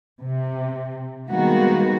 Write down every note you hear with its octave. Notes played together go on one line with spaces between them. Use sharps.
C3
D#3 G3 G#3 A#3 B3 F#4